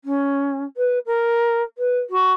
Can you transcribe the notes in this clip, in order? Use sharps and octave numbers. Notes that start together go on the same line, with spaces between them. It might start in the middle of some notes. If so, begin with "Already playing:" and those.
C#4
B4
A#4
B4
F#4